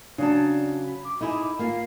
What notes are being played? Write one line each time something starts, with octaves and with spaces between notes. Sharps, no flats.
C#3 F#3 D4 A5
B5
D6
D#4 E4 G#4
A#3 F4 C7